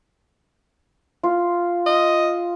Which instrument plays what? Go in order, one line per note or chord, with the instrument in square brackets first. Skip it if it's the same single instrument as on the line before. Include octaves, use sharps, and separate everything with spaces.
[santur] F4
[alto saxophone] D#5